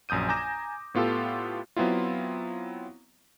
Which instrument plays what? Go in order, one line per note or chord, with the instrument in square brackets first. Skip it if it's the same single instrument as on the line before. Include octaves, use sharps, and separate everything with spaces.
[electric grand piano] A#1 F#2 D#6 G6 D#7
G#5 A#5 D6 G6 A#6 E7
A2 B3 F4 G4 A4
F#3 B3 C4 E4 F4